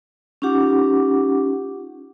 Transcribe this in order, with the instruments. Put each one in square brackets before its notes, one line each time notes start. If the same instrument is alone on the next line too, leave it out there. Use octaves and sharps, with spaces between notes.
[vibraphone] C#4 D#4 F4 G4 F#5 D6